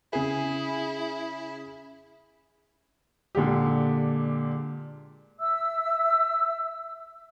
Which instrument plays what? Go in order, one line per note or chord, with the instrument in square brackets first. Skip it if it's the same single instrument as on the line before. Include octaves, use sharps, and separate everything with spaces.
[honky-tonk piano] C#3 G#4 [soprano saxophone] E4
[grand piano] A#2 D3 G#3 G4
[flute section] E5 E6